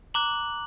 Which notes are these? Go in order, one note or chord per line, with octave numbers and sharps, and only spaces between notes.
A#5 D6 F#6 F#7